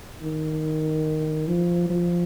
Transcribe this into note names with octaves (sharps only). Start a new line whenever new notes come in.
D#3
F3
F3